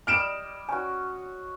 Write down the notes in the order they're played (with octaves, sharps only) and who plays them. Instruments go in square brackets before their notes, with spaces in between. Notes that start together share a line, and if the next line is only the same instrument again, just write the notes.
[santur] G3 D5 D#5 [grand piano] F6 D7 E7
[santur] C#4 F#4 [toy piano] G#5